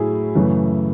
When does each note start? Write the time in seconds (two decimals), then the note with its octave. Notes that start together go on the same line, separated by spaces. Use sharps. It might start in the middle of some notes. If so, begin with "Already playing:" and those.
Already playing: A2 F#3 A3 E4 G#4
0.35 F#2 C#3 E3 A3